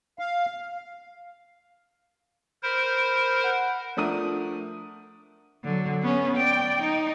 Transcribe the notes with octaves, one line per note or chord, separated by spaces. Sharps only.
F5
A#4 C5 B5
F#5
F3 A3 D4 A#4 D#6 D#7
D3 F#3
B3 C#4
D5 G5
D#4